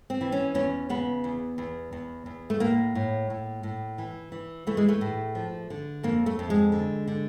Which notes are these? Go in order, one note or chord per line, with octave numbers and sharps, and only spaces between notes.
C4
E3
C#4
E2 C#4
C#3 B3
E2
E2
E2
E2
A3
A2 A#3
A2
A2
A2
E3
E3
E3 A3
G#3
A3
A2
F3
D3
F2 A#3
A3
F2
G#3
D3
D3